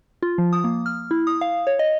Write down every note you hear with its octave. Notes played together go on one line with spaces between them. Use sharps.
F4
F3
D#6
A#3
F6
E4
D#6
F5
C#5
D#5